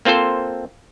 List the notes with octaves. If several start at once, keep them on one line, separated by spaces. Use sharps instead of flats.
A#3 C4 F4 A4 C5